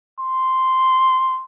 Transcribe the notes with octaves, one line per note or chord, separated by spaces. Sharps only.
C6